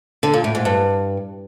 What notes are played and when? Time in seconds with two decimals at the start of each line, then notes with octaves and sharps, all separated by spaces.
0.23 D3
0.34 A#2
0.44 A2
0.55 G#2
0.65 G2